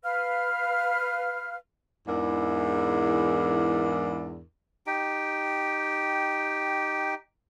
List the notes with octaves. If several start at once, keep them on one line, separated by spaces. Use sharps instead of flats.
B4 F5 F6
E2 G#2 E3 D4 E4 A#4
D#4 G4 G5